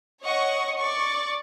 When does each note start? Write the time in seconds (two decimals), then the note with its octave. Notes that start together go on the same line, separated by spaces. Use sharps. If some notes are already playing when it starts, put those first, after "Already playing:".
0.22 C#5 D#5 F#5 C#6
0.78 D5 C#6